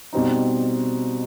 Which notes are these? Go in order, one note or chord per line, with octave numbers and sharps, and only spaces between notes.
B2 G3 C4 D#4